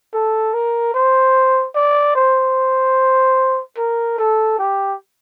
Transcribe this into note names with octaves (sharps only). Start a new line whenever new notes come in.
A4
A#4
C5
D5
C5
A#4
A4
G4